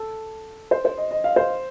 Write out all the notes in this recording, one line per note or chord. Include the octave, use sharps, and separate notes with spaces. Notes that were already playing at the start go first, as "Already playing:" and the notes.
Already playing: A4
C5
C5
D#5
D#5
F5
C5